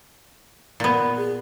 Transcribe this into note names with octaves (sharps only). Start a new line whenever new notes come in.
A#2 B3
G#4